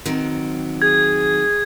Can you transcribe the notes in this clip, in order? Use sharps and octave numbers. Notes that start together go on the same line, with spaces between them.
D#3 F#3 C4
G#4 G#6